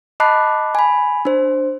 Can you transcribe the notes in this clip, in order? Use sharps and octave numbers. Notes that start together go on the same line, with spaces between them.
D#5 A5 B5 D6 F#6 C7
G#5 B5
D4 C5